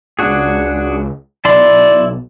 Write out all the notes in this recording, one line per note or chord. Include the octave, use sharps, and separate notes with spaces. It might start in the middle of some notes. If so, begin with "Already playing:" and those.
C#2 D4 F#4 G#4
B1 E4 D5 A5 C6